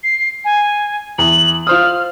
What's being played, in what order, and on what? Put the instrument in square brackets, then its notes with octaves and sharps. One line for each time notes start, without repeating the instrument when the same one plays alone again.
[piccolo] C7
G#5
[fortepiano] E2 [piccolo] F#7
[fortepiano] F4 C5 D#6 [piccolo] F6